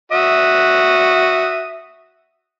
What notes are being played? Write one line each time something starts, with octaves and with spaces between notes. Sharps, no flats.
F#4 E5 D#6